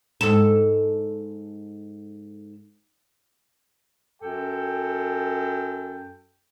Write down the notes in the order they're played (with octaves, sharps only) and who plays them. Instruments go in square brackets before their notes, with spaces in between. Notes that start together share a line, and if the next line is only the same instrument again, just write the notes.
[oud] G#2 A4
[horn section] F#2 A4 G5